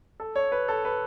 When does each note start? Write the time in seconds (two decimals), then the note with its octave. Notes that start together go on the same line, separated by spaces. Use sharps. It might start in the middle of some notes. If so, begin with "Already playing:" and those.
0.20 A4
0.36 C#5
0.52 B4
0.68 A4
0.85 B4